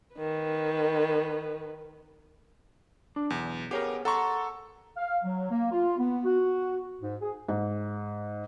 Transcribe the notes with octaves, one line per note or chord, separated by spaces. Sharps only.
D#3 B4
D4
B1 E2
B3 G4 G#4 A#4 C#5
A4 F#5 A#5 C6 C#6
F5
F#3
A#3
F4
B3
F#4
G#2
G#4
G#2